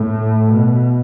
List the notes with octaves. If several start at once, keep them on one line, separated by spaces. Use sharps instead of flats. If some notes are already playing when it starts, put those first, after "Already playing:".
Already playing: A2
B2